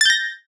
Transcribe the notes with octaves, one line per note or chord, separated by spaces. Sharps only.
G6 A6 A#6